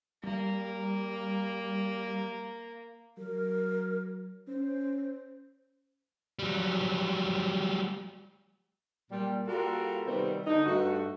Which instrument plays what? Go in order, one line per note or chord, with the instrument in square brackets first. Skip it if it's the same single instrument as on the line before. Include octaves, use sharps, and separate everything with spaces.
[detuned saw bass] G3 [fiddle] A#3
[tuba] F#3 [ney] A#4
[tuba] C#4 [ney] C5
[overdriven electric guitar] F#3 G3
[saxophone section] A#2 G3
G3 A#3 F4 F#4 A4 A#4
C3 D#3 G3 B3 C4
D3 D#4
G2 A3 F#4